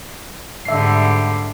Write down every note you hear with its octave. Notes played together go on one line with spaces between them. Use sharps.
G#2 D3 G3 E5 C7